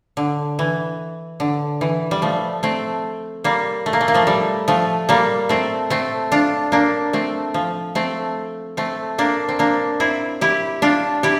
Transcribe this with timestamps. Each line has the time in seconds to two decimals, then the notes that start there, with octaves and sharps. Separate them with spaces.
0.17 D3
0.59 E3
1.40 D3
1.81 E3
2.11 G3
2.22 F3 A3
2.63 A3 C4
3.44 G3 A#3
3.86 A3
3.93 A#3
4.01 A3
4.08 A#3
4.14 F3 A3
4.27 G3
4.68 F3 A3
5.09 G3 A#3
5.49 A3 C4
5.90 A3 C4
6.32 D4 F4
6.72 A#3 D4
7.13 A3 C4
7.54 F3
7.95 A3 C4
8.77 A3 C4
9.18 A#3 D4
9.49 C4
9.59 A#3 D4
10.00 C4 E4
10.41 E4 G4
10.82 D4 F4
11.23 E4 G4